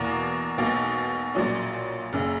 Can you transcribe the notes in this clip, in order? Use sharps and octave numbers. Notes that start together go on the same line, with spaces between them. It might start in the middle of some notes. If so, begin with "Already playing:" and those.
Already playing: E2 B2 A#3 A#4
B1 B2 A#3
A#1 A#2 F#3 C#4
F#1 F#2 C#3